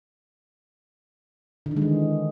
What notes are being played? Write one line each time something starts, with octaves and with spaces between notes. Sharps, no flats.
D3
D#3
G#3
E3